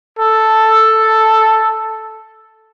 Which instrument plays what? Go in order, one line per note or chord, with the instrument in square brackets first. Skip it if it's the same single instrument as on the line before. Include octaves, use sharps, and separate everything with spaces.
[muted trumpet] A4